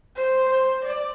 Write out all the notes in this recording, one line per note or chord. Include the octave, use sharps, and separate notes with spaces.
C5
C5
D5